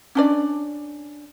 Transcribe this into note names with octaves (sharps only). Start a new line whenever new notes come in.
C#4 D4 D5